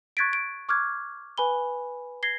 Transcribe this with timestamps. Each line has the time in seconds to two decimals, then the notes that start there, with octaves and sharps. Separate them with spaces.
0.17 C#6 F#6 G#6 A6 B6 D7
0.33 D7
0.69 C#6 D6 F6 F#6 G#6
1.38 B4 G#5 B5 G7
2.23 G#6 A#6 C7 G7